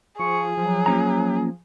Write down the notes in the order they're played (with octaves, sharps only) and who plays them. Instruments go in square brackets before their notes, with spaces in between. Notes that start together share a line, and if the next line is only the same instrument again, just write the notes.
[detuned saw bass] F3 [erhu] G#4 [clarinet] C#6
[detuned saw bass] F3 [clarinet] F#3
[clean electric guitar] A#3 C#4 A#5